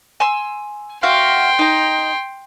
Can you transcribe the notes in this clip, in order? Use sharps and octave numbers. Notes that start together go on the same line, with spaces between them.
G#5 C6 E6
F#4 E5 F5 G5 C6
D#4 A#5